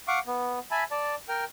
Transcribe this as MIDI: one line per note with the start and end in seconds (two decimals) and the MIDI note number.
0.08 0.19 77
0.08 0.19 78
0.08 0.19 85
0.08 0.19 86
0.27 0.59 59
0.71 0.84 76
0.71 0.84 80
0.71 0.84 81
0.71 0.84 83
0.91 1.15 74
0.91 1.15 81
1.29 1.44 70
1.29 1.44 79
1.29 1.44 89